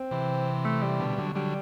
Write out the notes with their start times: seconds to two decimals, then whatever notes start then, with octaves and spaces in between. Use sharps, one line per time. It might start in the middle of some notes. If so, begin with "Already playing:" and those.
Already playing: C4
0.11 C3 E3
0.65 A3
0.83 G3
1.00 B2 D3
1.18 D3 F#3
1.35 D3 F#3 G3